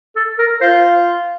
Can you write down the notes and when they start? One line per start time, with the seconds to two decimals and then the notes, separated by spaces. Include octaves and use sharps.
0.16 A4
0.38 A#4
0.61 F4 C5